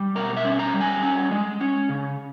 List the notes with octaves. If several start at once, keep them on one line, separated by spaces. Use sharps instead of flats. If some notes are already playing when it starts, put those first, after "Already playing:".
Already playing: G3
B2 A#4
E5
C#4
A#5
G3
G#5
C#4
G#3
C#4
C#3